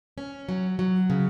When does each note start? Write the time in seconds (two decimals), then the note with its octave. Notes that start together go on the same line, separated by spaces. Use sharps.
0.18 C#4
0.49 F#3
0.79 F#3
1.10 C#3